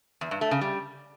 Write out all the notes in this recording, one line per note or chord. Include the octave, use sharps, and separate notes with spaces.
E2
G2
A3
C#3
G3